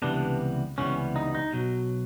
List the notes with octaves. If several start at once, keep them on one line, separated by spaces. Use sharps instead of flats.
C#2 C3 E3 G3 B3 D4
C#2 C3 E3 G3 B3 C#4
D#4
D#4
B1 B2 F#3